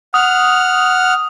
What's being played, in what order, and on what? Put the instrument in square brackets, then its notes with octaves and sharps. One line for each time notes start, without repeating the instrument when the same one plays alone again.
[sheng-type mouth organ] F#5 F6 [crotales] D#6